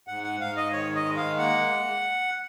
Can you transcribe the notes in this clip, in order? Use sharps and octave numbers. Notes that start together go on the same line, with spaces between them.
G#2 F#5
F#5
G#2 F5
D#5
D#3 C#5
D#5
G#3
F5
A#3 F#5